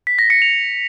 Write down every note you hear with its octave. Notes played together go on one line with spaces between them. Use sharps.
B6
A#6
C#7
F7